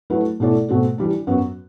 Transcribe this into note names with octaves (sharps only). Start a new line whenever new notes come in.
F#3 A3 E4 B4
B2 A3 E4 A4 D5
B2 A3 C4 F#4 A4
E3 G3 D4
F#2 F#3 B3 F#4